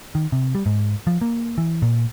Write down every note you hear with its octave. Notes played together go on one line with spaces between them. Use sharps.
D#3
C3
G3
G#2
F3
A#3
E3
A#2